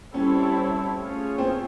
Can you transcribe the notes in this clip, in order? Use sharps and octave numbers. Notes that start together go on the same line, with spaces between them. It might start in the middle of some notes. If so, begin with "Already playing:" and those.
G3 C4 C#4 E4 A4 C#5
A3 C#4 F4 G#4 C#5
C4